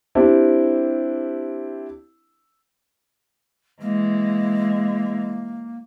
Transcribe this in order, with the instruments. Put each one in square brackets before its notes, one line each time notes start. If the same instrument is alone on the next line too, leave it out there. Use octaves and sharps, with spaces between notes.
[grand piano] C4 D4 E4 G4
[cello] E3 G#3 [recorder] A#3